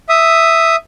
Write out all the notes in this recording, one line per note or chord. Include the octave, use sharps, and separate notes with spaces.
E5 D#6